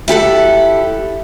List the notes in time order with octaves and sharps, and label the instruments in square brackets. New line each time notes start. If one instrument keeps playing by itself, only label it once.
[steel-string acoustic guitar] E4 G4 A4 F#5